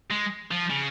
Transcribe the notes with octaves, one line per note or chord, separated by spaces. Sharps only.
G#3
F3
C#3